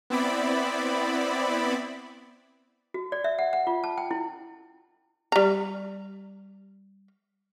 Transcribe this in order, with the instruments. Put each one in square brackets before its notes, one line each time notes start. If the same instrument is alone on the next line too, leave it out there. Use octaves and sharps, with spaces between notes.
[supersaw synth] B3 C4 E4 D5 B5
[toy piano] F#4
D5
E5
F#5
F#5
F4
A5
G5
E4
[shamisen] G3 A#5